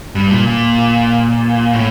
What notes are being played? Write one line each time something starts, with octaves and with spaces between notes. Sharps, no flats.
G2
A#2
A#2
A2